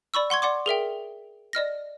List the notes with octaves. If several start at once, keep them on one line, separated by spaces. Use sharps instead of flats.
D5 B5 C#6 E6
F#5 C6 C#6 G#6
D5 F#5 C6 D6
G#4 A#4 E5 G5
D5 D#5 F6 A#6